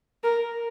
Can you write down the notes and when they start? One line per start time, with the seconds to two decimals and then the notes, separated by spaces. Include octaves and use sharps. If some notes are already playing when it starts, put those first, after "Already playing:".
0.24 A#4